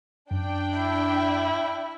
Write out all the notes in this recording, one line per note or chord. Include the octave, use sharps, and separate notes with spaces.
F#2 D4 G5
E4